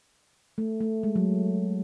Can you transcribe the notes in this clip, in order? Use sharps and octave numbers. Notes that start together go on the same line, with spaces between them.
A3
A3
G#3
F#3